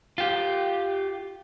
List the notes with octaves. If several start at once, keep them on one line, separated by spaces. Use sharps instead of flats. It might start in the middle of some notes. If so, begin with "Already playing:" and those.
F4 G4